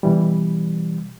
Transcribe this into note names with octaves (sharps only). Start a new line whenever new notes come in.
B2 E3 G3